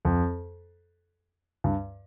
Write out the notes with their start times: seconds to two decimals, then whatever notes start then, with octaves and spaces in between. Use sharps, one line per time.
0.05 F2
1.64 G2